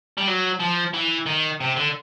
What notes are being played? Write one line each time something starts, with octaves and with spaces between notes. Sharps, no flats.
G3
F#3
F3
E3
D#3
C3
D3